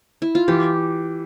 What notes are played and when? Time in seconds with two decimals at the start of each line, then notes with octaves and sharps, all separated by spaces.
0.22 E4
0.35 F4
0.48 E3 G4